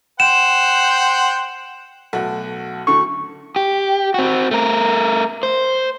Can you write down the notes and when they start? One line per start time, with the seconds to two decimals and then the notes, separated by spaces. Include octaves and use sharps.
0.20 C5 F#5 G5 E7
2.13 B1 A3 F#4
2.87 D2 D3 C#6
3.56 G4
4.14 C4 F#4
4.51 A3 A#4
5.43 C5